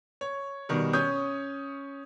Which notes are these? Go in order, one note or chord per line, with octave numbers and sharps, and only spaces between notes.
C#5
B2 D#3 G3
C#4 C#5 D#6 G6